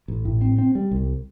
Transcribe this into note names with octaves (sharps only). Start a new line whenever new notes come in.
A1
A2
C4
C4
G3
C2